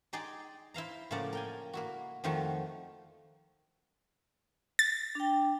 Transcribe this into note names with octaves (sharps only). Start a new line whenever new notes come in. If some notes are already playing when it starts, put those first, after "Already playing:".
D#4 G#4 D5 G5 A#5 C6
E4 C5 F5 A#5
A2 C#3 F3 A#3 D5 F#5
A#4 G5 G#5
A#3 E4 F#4
F2 D#3 F3 A3 F#4
A6
D4 G5